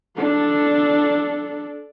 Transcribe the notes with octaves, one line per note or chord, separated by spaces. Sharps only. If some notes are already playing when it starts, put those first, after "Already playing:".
D4 A4